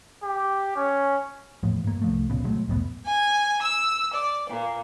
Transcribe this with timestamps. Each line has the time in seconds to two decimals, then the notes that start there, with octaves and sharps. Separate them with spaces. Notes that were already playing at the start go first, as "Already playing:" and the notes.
0.23 G4
0.76 C#4
1.63 E2 A2 F3
1.84 G2 A#3
2.02 C2 F3 A3
2.30 C#2 A#2 C#3 B3
2.44 B2 F#3 G#3 A3
2.68 C2 F2 A2 B3
3.03 G#5
3.60 E6
4.12 D5
4.48 A#2